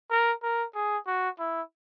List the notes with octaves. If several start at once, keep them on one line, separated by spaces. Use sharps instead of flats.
A#4
A#4
G#4
F#4
E4